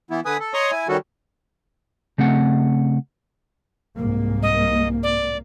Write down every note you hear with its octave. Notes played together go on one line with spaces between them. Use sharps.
E3 B3 E4
D3 B4 G#5 D#6
A4
C#5 D#5 A#5 C6 C#6 D#6
E4 G#5
D#3 G3 C#4 F#4 A4
C#3 A3 C4 F#5
C2 G#2 A#3
D#5
D5